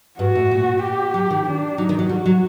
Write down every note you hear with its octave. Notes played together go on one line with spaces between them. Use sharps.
G2 F#4
A2
A#2
G4
F#3
D#3
D4
F#3 D#4
D#3
F#3
G3 F#4
F#3